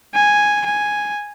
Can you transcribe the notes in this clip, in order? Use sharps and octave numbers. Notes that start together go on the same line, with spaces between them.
G#5
G#5